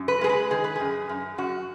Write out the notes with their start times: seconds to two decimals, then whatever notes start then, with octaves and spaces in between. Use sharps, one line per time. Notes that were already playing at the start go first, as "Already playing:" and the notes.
Already playing: F#2
0.08 B4
0.21 G#3 G#4
0.29 B4
0.51 D#3 G#4
0.64 B4
0.76 F#2 G#4
1.09 F#2
1.38 F#2 F#4